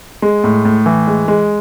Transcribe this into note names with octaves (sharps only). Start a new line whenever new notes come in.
G#3
A2
A2
E3
G#3
G#3